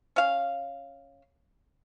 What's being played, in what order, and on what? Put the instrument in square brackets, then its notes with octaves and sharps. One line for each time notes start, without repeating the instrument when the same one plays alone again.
[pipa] C#4 F5